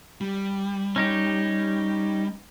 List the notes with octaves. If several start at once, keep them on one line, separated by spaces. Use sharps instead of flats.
G3
C#4 D#4 G4